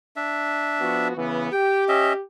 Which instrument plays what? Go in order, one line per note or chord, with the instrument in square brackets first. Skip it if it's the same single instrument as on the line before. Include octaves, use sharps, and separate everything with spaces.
[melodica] D4 E5
[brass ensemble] F3 B3 F#4
C#3 E3 B3
[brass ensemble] G4 [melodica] G5
[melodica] C#4 D#5 E5